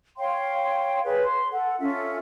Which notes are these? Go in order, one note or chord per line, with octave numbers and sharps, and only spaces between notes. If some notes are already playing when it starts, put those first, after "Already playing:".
C#5 F5 G5 C6
G#4 B4 C#5
C6
A4 F#5
C#4 F4 A4 E5